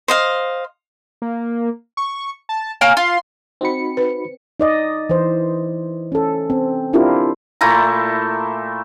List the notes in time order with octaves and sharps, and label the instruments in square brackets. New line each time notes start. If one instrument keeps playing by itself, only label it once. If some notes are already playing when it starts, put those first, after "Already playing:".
[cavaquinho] C5 D#5 F5
[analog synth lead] A#3
C#6
A5
[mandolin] A#3 A#4 G#5 [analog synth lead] C#5
[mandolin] F4 [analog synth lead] C6
[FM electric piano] C4 C#7 [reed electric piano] D#4 F#4 B5
[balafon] B4
[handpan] D#4 D5 D#5
E3 C5
C#4 A4
C4
C4 D4 E4 F4 G4 A#4
[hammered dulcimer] A#2 A3 E4 A#5